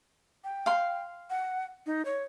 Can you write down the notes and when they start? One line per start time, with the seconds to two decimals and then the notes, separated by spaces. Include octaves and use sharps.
0.44 G5
0.66 F5 C6
1.30 F#5
1.86 D#4
2.05 C#5